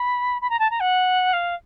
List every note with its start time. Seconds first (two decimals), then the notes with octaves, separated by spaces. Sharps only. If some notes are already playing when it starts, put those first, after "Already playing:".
Already playing: B5
0.41 B5
0.50 A#5
0.59 A5
0.70 A#5
0.80 F#5
1.33 F5